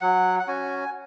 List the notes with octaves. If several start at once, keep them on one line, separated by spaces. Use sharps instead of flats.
F#3 F#5
F#5
C#4 F#4 G#5